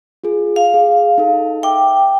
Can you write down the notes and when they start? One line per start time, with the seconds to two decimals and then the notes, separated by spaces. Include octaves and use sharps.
0.24 F4 G#4
0.56 F5
0.74 G#4
1.18 D#4 A4
1.63 E5 G5 D6